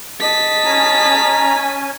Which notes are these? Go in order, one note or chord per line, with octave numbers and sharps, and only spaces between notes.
D#5 A5 B6
C#4 G#5 A#5